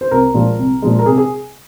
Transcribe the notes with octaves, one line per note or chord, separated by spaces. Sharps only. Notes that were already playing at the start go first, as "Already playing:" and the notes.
C5
C2 A#4
A#2 F3 G#3
C2
A#2 F3 G#3
A#4
C3 G#4
G#4